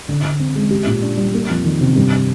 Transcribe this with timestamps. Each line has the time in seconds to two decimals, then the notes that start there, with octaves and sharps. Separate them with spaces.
0.09 D3
0.23 D3
0.39 C4
0.55 G#3
0.71 G4
0.87 A#2
1.02 D4
1.17 G3
1.34 A#3
1.49 F2
1.64 D#3
1.81 C3
1.96 G2